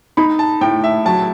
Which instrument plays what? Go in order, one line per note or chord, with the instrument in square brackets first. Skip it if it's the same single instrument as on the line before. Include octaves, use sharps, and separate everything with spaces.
[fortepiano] D#4 [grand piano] B5
[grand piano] A5
[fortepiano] A2 [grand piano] G5
[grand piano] E5
[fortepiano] F#3 [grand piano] A5